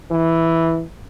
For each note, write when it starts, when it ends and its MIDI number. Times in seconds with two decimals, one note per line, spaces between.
0.11 0.83 52